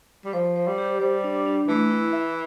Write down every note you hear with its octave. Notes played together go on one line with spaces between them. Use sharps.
G3
F3 C5
C5
G3
G4
G3 C5
D4
D4
E3 A3
E4
E5